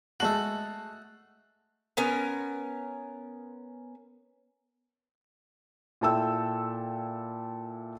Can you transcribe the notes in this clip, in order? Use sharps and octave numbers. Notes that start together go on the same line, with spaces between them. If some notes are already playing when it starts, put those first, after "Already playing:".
G#3 A3 F#4 A5 F#7
B3 C#4 A#4
A#2 E4 A4 G5 E6